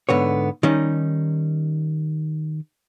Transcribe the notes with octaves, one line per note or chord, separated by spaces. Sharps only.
G#2 D3 B3 C#5
D#3 G3 C#4 D#4